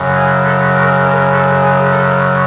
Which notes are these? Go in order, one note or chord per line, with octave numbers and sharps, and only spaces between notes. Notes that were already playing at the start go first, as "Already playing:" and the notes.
Already playing: F#2 C#3 F#3
G#4
A4
A#4
A#4
A4
G#4
A4